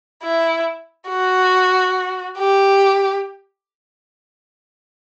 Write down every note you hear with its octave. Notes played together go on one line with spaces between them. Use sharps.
E4
F#4
G4